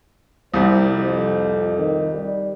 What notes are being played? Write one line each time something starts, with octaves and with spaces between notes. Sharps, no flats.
C2 G3 C5
F2
D#3
G3